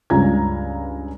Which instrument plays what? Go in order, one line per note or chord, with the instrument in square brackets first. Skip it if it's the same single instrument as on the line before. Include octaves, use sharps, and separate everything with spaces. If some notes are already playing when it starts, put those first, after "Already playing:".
[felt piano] C#2 G2 C#4 F4 A#5 G#6